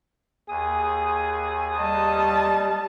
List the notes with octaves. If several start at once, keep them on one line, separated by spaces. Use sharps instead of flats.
D#2 G#4 D#6
G3 D#5 A5